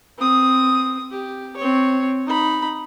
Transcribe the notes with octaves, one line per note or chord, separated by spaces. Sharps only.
C4 D#6
G4
C4 C#5
D#4 B5